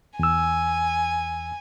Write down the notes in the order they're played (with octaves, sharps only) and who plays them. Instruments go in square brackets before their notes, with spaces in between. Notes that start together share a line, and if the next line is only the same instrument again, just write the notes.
[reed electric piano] E2 E6 [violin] G#5